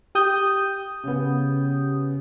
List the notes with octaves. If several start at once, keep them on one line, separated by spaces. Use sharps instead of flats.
G4 D#6 G6
C#3 B3